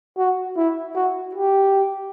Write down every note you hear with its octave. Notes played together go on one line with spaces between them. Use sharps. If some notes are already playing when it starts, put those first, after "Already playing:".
F#4
E4
F#4
G4